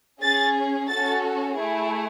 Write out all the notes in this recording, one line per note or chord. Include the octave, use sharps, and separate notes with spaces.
C#4 G#4 A6
C#4 F#4 A4 A6
A3 E4 G#4